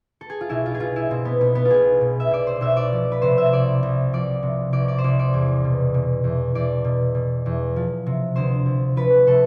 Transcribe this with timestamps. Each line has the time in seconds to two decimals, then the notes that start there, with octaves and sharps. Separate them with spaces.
0.21 A4
0.30 G#4
0.41 F4
0.49 B1 E4
0.66 F4
0.74 G#4
0.80 B2 F4
0.96 E4
1.11 B2 C4
1.25 B3
1.41 B1 B3
1.55 B3
1.65 F4
1.70 B1 G#4
2.01 B2
2.20 E5
2.31 B2 D5
2.47 C5
2.61 B1 E5
2.77 D5
2.92 F3
3.12 B4
3.22 C3 C5
3.38 E5
3.52 C2 D5
3.83 C2
4.13 F3 D5
4.43 C3
4.72 C2 D5
4.88 D5
4.98 C5
5.04 C2 D5
5.19 D5
5.34 E2
5.64 B2
5.94 B2
6.24 E2
6.55 E2 D5
6.84 B2
7.15 B2
7.46 E2
7.76 F3
8.06 C3
8.36 D2 C5
8.66 D2
8.96 F3 B4
9.27 C3 A4